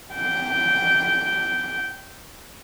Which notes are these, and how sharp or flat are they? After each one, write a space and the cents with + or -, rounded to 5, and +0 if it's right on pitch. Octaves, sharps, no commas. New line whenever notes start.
G5 -10